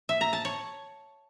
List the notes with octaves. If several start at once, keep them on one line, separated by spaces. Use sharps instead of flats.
E5
A#5
A5
C#5